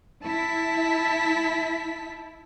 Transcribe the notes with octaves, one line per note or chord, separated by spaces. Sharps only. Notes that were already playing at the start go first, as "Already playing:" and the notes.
E4 A5 B6